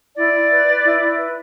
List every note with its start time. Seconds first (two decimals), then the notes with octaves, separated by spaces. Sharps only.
0.16 E4 D5
0.34 E4
0.50 B4
0.66 B4
0.84 E4
1.00 E4
1.17 B4